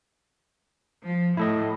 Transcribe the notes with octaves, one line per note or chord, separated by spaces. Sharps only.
F3
A2 E4 A4 D#5